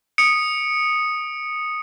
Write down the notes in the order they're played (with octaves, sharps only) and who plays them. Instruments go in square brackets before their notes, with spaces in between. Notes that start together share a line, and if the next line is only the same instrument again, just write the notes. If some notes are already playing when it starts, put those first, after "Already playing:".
[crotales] D#6 C#7 D7